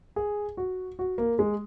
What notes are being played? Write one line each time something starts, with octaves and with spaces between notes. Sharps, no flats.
G#4
F#4
F#4
A#3
G#3